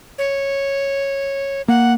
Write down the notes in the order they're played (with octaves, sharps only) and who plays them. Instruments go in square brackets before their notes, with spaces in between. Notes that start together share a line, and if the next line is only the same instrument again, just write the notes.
[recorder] C#5
[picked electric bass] A#3 [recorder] F#5